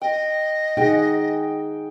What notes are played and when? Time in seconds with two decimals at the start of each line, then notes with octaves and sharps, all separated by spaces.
0.02 D#5 G5
0.77 D#4 G#4 F#5 G5